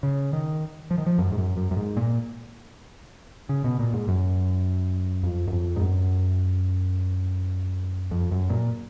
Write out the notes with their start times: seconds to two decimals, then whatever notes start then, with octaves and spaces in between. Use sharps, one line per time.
0.03 C#3
0.33 D#3
0.91 F3
0.98 D#3
1.06 F3
1.18 F#2
1.32 G#2
1.38 F#2
1.57 F#2
1.71 F#2
1.77 G#2
1.97 A#2
3.49 C#3
3.64 B2
3.79 A#2
3.93 G#2
4.08 F#2
5.23 F2
5.48 F#2
5.53 F2
5.76 G#2
5.81 F#2
8.11 F2
8.32 F#2
8.50 A#2